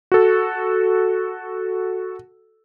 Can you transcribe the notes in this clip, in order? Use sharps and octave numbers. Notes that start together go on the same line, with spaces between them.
F#4 A4